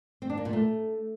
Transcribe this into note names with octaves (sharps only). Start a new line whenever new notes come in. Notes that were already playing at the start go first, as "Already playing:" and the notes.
C4
D4
A#3
A#2
A3